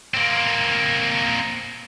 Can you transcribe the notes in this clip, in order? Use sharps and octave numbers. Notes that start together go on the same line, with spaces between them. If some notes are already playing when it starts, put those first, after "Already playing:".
A#3 C4